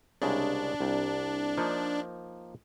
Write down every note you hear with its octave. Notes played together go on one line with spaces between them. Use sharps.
C2 C#3 G#3 D4
C2
F3 A#3 D#4